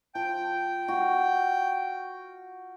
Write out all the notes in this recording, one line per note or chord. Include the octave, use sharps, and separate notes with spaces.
F3 G5
F#4 F5